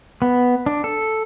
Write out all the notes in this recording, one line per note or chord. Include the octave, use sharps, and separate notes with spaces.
B3
D4
A4